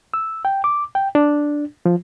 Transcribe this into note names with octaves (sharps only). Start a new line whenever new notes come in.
E6
G5
D6
G5
D4
F3